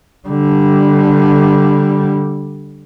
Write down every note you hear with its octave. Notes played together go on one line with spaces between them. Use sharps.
D3 G3